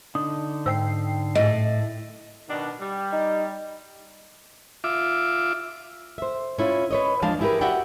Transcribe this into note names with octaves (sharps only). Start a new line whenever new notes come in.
D3 D4 D#4 D#6
G#2 C5 G5 E6 C7
A2 D#5
B2 D#3 D4
G3
D#4
F4 E5 D6
C5 E5
C#4 E4 F4
B4 C#5 D#5
E2 F3 G#3 D4 F5 A5
E4 G4 G#4 A#4 B4
F#4 G4 D5 E5 F#5 G5